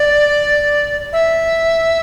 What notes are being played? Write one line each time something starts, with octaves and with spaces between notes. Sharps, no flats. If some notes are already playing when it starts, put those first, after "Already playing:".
Already playing: D5
E5